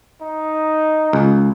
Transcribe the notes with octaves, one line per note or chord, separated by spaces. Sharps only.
D#4
C#2